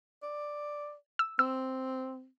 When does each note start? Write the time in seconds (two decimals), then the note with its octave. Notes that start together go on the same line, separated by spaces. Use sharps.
0.22 D5
1.19 E6
1.39 C4 E6